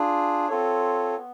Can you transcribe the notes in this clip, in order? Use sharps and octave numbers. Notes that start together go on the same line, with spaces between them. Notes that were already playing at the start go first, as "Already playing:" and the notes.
Already playing: D4 F4 G#4
C4 F4 A4 C#5
B3